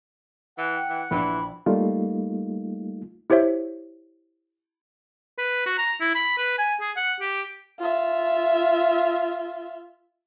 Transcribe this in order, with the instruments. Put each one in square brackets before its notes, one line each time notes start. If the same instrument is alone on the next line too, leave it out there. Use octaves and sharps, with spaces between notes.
[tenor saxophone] E3 [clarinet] F#5
[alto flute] G5
[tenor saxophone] E3
[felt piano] A#1 [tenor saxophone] E3 [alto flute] B5
[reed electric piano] G3 A3 A#3 D#4 F4
[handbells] E4 G4 C5 C#5 E5
[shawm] B4
F#4
A#5
E4
B5
B4
G#5
G#4
F#5
G4
[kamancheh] F4 E5